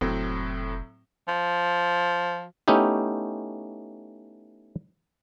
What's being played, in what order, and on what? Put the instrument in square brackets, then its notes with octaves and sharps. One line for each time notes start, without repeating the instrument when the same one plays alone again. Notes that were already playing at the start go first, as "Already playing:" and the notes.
[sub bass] F1 [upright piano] A2 F#3 C4
[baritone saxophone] F3
[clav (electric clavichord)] A3 B3 C#4 D#4 E4 G4